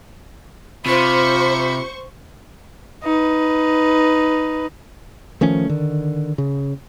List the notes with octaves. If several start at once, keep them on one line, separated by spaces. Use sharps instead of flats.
C3 F4 C5 B5 C#6
D#4 B4
D#3 F3 A3 C#4
D3 D#3
C#3